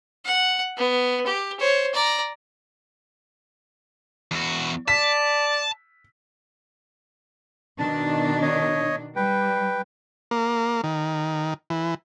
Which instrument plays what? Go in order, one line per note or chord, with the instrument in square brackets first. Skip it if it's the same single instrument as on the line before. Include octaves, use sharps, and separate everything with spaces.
[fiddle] F#5
B3
G4
C5 C#5
D5 A#5
[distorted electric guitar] E2 F#4
[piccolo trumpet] D5 [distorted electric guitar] A5 [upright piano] B6
[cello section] B2 D#3 D4 [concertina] A5
[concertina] C#5 D#5
[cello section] G3 [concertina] B4 G5
[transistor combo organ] A#3
D#3
E3